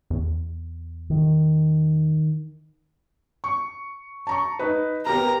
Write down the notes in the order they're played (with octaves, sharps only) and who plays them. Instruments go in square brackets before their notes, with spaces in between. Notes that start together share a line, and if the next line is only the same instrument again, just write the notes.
[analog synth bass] E2
[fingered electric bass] D#3
[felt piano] C#6
A5 A#5 C#6
D#4 B4
[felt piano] B3 G4 A#4 [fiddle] A#5